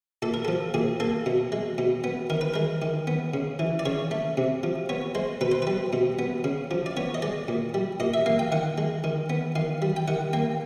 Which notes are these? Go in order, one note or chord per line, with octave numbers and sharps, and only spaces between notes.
A#2 A4
A#4
F3 A4
A#2 G#4
A#3 A4
B2
G#3
B2
B3
D#3 A#4
B4
G#3 A#4
D#3
B3
C#3
E3
D5
C#3 C#5
A3
C3
F3
B3 C#5
G#3 C5
B2 B4
C5
G3 B4
B2
B3
C#3
F3
D5
B3 C#5
D#5
G#3 D5
A#2
G3
A#2 D#5
E5
A#3 F5
G5
D#3 F#5
G#3
D#3
B3
D#3 F5
G3
G5
D#3 F#5
A#3 G5